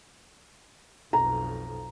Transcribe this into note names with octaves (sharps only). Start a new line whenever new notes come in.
B1 F2 A#5